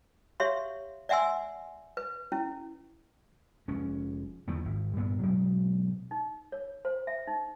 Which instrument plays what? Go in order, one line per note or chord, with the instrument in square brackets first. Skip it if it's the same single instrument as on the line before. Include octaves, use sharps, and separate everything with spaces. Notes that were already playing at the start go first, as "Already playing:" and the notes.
[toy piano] G4 C#5 E5 F5 C6
D5 E5 F#5 G#5 C6 E6
B4
C#4 E4
[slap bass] F1 G#3 C#4
E2 D3 D#3 F3
G#1
G2 A#2 B3
B2 F#3 G#3 C4
[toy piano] D#4
C#5
C5
E5
D#4